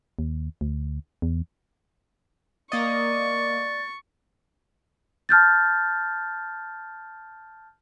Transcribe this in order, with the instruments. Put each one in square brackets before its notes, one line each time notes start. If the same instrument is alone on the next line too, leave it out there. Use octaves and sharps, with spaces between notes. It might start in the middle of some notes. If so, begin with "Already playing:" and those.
[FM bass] D#2
D2
E2
[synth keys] A#3 D#5 [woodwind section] D5 [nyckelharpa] C#6 [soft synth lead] A6
[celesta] A5 F6 G6 A6